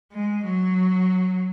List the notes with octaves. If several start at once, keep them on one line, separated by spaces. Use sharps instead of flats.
G#3
F#3